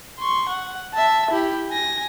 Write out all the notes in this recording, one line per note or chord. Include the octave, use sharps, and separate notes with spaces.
C6 C#6
F#5
E5 A5
E4 G4
G#5 A#6